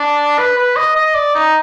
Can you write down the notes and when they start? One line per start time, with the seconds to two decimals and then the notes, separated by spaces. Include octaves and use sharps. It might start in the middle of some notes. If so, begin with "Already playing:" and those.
Already playing: D4
0.38 B4
0.57 B4
0.77 D#5
0.96 D#5
1.15 D5
1.35 D#4